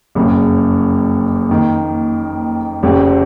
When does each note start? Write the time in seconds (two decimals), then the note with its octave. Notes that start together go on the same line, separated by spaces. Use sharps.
0.15 F#1 F2 C#3
1.49 F2 D#3 A#3
2.83 F1 F2 C#3 F3 C4